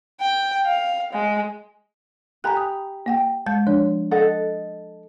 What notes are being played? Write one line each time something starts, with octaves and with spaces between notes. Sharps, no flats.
G5
F5
G#3
G4 G#5 A#5 B5 F#6
D#6
A#3 F#5 G5
G#3 A5 G6
F3 D4 C#5
A4 D#5 F#5